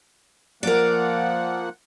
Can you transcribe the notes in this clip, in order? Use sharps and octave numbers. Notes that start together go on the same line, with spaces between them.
F3 A#3 A#4 D5 F#5